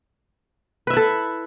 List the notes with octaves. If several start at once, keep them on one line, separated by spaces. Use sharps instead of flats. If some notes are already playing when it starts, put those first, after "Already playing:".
E4 A4 B4 E5